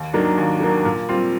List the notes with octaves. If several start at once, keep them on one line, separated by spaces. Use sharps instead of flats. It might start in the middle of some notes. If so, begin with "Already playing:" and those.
Already playing: D#2
D#3 F#3 A#3 D4
D#2
D#3 F#3 A#3 D4
A#2
G3 C4 F4